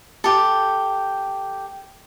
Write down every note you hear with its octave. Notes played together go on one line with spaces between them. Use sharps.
G4 A4